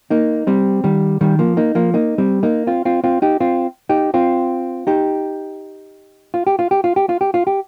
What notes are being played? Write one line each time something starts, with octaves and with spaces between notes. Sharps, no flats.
A#3 D#4
G3 C4
D#3 G3
D#3 G3
F3 A#3
A#3 D#4
F3 A#3
A#3 D#4
G3 C4
A#3 D#4
C4 F4
C4 F4
C4 F4
D#4 G4
C4 F4
D#4 G4
C4 F4
D#4 G4
F4
G4
F4
G4
F4
G4
F4
G4
F4
G4